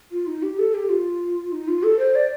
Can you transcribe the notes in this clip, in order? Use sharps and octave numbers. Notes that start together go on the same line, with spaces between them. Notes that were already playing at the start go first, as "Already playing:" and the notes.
F4
D#4
G4
A4
G4
F4
D#4
F4
A4
C5
D5